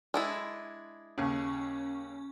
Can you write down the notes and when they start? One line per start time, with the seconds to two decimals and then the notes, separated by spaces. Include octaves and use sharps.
0.14 G#3 D4 E4
1.18 D#2 C#3 C#4